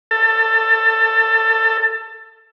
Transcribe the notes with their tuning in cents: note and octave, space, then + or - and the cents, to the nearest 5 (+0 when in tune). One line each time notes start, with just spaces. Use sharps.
A4 +25